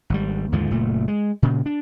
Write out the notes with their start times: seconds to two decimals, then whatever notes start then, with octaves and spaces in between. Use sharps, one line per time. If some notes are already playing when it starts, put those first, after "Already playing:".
0.10 G#1 G3
0.52 D#2 G#2 D3 F3
0.71 F#1 A#2 A3
1.08 G#3
1.42 A#2 C#3
1.66 D4